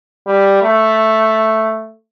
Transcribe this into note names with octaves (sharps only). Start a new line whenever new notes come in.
G3
A3